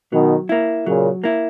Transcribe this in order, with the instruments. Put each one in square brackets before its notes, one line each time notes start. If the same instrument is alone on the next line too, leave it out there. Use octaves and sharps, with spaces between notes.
[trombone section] B2 D#3 [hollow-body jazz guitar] F#3
[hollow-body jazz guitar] A#3 E4
[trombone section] A#2 C#3 [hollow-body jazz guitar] F#3
[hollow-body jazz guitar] A#3 E4